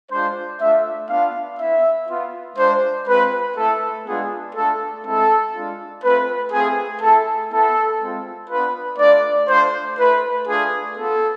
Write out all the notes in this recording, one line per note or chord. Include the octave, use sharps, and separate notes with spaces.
G#3 D4 F4 C5
A3 D4 F4 E5
B3 D4 F4 F5
B3 E4 E5
B3 F4
G#3 D4 F4 C5
G#3 C4 F4 B4
A3 E4 A4
G#3 B3 D4 F4 G#4
A3 D4 F4 A4
G#3 C4 E4 A4
G#3 D4 F4
A3 C4 F4 B4
A3 C4 F4 G#4
A3 E4 A4
B3 E4 A4
G#3 C4 F4
B3 D4 F4 B4
A3 D4 F4 D5
A3 D4 F4 C5
A3 E4 B4
A3 D4 F4 G#4
B3 F4 A4